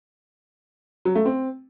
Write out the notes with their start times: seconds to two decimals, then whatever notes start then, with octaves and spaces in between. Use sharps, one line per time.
1.05 F#3
1.15 A3
1.25 C4